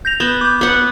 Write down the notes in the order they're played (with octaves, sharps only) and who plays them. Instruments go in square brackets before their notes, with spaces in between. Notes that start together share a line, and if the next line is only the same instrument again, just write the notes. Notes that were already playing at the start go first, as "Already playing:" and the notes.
[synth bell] G6 A#6 F7
[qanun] B3 [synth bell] G6 E7 G7
[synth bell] D6 G6
[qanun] B3 F#5